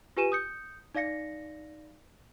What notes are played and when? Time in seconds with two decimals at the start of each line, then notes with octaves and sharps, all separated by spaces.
0.17 F4 G4 B4 G#5 D#7 E7
0.32 D#6 G6 C#7
0.95 D#4 D5 F5 A#6 C#7